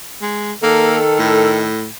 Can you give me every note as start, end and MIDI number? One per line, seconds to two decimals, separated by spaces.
0.22 0.52 56
0.63 1.70 51
0.63 0.98 58
0.63 1.70 69
1.19 1.87 45